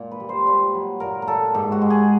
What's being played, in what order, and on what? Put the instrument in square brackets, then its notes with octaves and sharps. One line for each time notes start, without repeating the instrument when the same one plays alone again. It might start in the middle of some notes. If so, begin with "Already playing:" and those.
Already playing: [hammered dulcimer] A#2
B4
G3
C5
A#2 B4
F#3
A#2 A#4
A#4
A#2 A4
G#2 G4
F#4
G#3
G#4